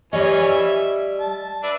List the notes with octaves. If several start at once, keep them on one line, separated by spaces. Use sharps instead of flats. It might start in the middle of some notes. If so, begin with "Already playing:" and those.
E3 G3 C#4 D5 D#5 C#6
E5
A5
D4 B4 E5